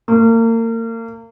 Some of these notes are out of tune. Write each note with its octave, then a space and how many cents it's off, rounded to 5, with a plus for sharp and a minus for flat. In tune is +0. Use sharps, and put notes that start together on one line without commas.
A#3 -35